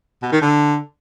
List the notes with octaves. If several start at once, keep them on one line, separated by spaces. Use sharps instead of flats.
B2
D#3
D3